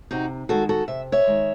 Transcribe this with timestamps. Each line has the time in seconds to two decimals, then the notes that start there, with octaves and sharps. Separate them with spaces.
0.11 C3 D#4 F#4
0.49 D#3 G#3 F#4 A4
0.69 F#4 A4
0.88 C3 E5
1.12 C#5 E5
1.27 D#3 G#3